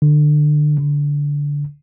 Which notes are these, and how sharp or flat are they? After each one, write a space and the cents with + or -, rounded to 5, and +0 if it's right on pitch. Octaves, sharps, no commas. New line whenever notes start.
D3 +25
D3 -20